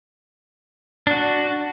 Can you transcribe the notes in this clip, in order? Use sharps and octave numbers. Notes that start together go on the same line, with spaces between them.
D4 F#4